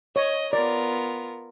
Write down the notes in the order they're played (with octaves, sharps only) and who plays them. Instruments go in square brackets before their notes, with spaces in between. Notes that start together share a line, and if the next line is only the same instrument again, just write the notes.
[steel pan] C#5 [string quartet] D#5
[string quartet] B3 F4 A#4 [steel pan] D5